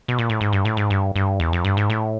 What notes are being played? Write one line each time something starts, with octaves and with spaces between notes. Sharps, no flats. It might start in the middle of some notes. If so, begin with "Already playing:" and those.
B2
A#2
A2
G#2
G2
A2
G#2
G2
G2
E2
F2
G2
G#2
A2